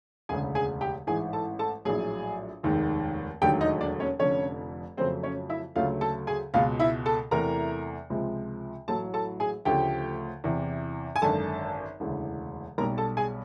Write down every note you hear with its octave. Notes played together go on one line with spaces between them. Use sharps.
E1 D2 C#3 G#4 G#5
G#4 G#5
G4 G5
A1 G#2 E3 G#4 G#5
A4 A5
A4 A5
A#1 A2 F#3 G#4 G#5
F1 D#2 D#3 G#3
E1 D#2 D3 F#3 A3 G4 G5
D#4 D#5
D4 D5
C#4 C#5
F1 F2 D3 C#4 C#5
F2 C#3 F#3 A3 C4 C5
C#4 C#5
E4 E5
D2 C#3 F#3 A3 F4 F5
A4 A5
G#4 G#5
C#2 B2 G#3 F4 F5
E4 E5
A4 A5
E2 C3 E3 A3 A#4 A#5
C#2 C3 F3 G#3
A1 A2 F#3 A4 A5
A4 A5
G#4 G#5
D2 C#3 F3 A3 G4 G5
E2 C3 E3
G#5
G#1 F#2 D3 A4 A5
E1 D2 C#3 E3
B1 B2 G3 A#4 A#5
A4 A5
G#4 G#5